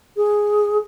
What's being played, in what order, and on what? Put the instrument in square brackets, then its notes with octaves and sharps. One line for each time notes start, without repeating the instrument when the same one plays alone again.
[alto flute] G#4